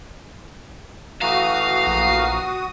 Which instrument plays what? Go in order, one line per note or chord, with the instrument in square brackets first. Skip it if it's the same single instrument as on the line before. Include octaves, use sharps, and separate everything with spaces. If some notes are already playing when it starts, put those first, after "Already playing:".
[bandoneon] E3 A3 A#5 [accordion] F#4 D#6 [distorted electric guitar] F5
[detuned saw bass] A#1